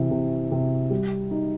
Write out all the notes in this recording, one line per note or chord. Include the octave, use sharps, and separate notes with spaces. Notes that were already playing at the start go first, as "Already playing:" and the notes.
Already playing: C3 E3
C3
C3
G3
D#4